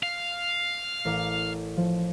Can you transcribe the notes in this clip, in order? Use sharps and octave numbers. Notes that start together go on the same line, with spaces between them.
F5
A1 A#4 D6
F3